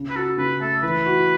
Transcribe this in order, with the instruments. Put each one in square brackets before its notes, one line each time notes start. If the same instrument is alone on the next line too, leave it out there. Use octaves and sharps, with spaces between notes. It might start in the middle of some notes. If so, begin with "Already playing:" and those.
Already playing: [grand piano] C#3
[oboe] B4
[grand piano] F#4 [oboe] A4
[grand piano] C#3 [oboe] B4
[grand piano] A3 [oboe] A4
[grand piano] E3 [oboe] B4
[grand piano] F#4